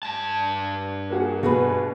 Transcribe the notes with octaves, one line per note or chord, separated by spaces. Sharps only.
G2 A5
A#3 F#4 G#4
B2 F#4 G#4 B4